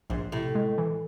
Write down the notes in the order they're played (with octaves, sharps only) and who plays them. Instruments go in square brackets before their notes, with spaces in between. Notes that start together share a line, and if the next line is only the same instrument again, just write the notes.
[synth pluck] A#1 [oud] G#2
[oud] A2 [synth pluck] C3
[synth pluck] G#3
E3